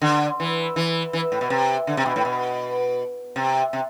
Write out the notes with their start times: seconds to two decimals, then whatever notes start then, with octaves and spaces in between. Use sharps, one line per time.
0.02 D3
0.40 E3
0.76 E3
1.13 E3
1.32 A2
1.41 B2
1.50 C3
1.87 D3
1.97 C3
2.06 B2
2.16 A2
2.25 B2
3.36 C3
3.73 C3